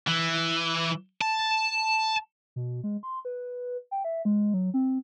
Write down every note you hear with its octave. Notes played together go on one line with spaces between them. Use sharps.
E3
A5
B2
G#3
C6
B4
G5
E5
G#3
F#3
C4